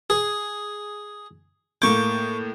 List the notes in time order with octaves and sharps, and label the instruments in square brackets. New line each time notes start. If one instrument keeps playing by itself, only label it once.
[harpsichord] G#4
[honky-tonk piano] A2 A#3 G6 [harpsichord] C#6 D6